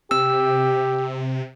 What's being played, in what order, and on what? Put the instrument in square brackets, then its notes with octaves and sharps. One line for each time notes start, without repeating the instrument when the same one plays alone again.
[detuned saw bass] C3 [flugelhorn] G4 [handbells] E6